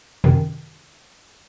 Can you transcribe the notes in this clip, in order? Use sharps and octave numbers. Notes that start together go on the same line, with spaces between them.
F#2 C3 D#3